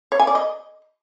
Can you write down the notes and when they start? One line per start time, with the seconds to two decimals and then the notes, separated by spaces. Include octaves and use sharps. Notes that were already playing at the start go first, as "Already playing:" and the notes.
0.12 C#5
0.20 G#5
0.27 D5
0.35 D#5